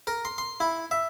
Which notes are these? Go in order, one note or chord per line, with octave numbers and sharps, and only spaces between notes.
A#4
C6
C6
E4
E5